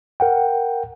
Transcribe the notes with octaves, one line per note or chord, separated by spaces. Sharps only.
A#4 F#5 G5